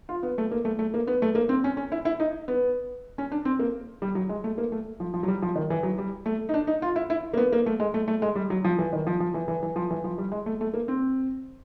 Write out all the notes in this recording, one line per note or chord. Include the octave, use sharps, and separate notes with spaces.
F4
B3
A3
A#3
A3
A3
A#3
B3
A3
A#3
C4
C#4
C#4
E4
E4
D#4
B3
C#4
D4
C4
A#3
G3
F#3
G#3
A3
A#3
A3
F3
F3
F#3
G3
F3
D#3
E3
F#3
G3
A3
D#4
D4
D#4
F4
E4
E4
A#3
B3
A#3
A3
G#3
A3
A3
G#3
G3
F#3
F3
E3
D#3
F3
F3
E3
E3
E3
F3
E3
F3
G3
G#3
A3
A3
A#3
C4